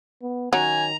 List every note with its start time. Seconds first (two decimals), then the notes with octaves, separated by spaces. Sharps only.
0.22 B3
0.53 D#3 F#3 C#4 G#5 A#5